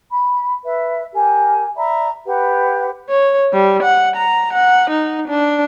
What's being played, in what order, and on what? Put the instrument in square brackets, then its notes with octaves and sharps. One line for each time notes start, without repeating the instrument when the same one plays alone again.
[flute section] B5
B4 E5
G4 A#4 G#5
D5 E5 A#5 B5
G4 B4 F#5
[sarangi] C#5
G3
F#5
A#5
F#5
D#4
D4